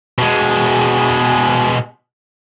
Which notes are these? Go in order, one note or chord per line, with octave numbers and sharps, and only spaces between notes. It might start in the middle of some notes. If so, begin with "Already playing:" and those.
B2 G#3